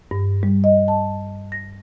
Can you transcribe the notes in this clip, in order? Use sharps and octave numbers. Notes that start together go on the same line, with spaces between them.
G2
G3
D#5
A5
A#6